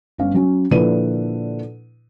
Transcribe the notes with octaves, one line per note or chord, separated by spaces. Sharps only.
G1 C#4 F5
F#3 C#4
A#2 D3 F3 E4 B4 D#7